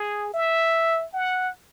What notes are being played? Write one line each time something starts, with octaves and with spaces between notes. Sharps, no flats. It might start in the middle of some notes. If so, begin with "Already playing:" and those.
Already playing: G#4
E5
F#5